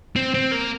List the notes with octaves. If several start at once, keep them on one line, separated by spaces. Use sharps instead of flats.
C4
C4
A#3